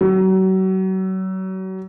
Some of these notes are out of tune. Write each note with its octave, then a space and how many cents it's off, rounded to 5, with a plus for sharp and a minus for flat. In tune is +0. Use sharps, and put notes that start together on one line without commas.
F#3 +35